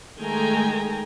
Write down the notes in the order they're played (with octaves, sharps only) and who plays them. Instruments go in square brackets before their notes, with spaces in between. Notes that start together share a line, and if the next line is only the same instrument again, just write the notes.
[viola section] D#3 G#3 A3 G5 G#5 A#5